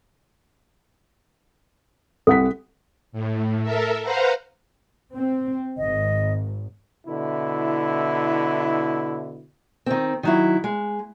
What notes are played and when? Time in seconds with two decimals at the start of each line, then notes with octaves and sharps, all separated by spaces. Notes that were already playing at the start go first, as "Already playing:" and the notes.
2.27 C2 A4 F#5 B6
3.12 A2
3.63 A4 A#4 E5
4.02 B4 C5 F5 F#5 A#5
5.12 C4
5.78 G#1 D#5
7.06 B2 D3 E4
9.86 D#3 C4
10.23 D#3 F#3 E4
10.64 G#3